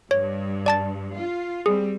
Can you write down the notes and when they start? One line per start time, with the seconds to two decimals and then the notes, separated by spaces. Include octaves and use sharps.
0.11 G2 C#5
0.66 D5 A5 A6
1.16 F4
1.66 G3 C4 G#4